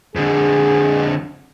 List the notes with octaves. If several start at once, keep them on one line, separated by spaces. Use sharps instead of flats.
F2 D3 G#4